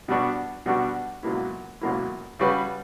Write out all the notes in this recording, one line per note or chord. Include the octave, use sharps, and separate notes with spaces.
B2 G3 B3 D4 F#4
B2 G3 B3 D4 F#4
C#2 B2 F#3 A#3 E4
C#2 B2 F#3 A#3 E4
C#3 G3 C#4 F#4 B4